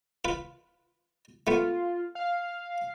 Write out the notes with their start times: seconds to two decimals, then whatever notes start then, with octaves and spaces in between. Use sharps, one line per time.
0.25 F4 B4
1.47 A3 B3 F4
2.15 F5